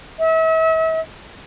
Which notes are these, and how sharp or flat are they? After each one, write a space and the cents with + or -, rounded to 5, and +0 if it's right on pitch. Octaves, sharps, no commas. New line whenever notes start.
E5 -40